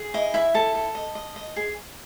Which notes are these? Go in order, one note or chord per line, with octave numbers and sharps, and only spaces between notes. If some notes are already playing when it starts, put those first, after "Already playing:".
Already playing: G#4
E4 D#5
E4 E5
A4 A5
A4
D#5
D#5
D#5
G#4